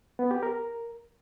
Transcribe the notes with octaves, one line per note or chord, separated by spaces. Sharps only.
B3
G4
A#4